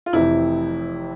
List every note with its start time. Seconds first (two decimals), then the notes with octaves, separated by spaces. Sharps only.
0.06 F4
0.13 F1 F2 C3 E3 E4